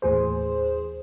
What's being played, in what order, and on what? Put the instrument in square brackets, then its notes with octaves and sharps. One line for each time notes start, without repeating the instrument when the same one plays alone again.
[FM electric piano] D#2 A2 E3 G#4 C5